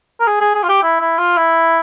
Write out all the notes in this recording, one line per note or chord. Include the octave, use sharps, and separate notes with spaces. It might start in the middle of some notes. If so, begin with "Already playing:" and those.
A#4
G#4
G#4
G#4
F4
G4
E4
E4
F4
E4